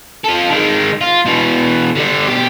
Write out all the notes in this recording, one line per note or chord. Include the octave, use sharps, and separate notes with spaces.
F4 A4
D#3 G#3
F4
B2 E3
D3 G3
B2 G4